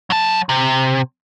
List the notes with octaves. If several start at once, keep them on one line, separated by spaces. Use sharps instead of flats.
F#3 A5
C3